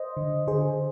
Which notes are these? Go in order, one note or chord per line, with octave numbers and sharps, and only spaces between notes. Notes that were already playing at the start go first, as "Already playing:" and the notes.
Already playing: C5 D#5
D3
D3 G#4 C5